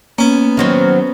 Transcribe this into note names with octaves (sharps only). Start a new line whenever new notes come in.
A#3 B3 C#4
D#3 F#3 C4